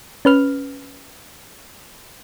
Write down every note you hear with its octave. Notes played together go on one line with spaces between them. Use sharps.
C#4 B4 F6